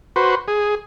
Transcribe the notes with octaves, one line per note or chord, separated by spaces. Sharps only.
F#4 B4 C5
G#4